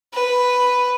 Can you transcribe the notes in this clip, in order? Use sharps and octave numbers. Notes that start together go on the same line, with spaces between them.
B4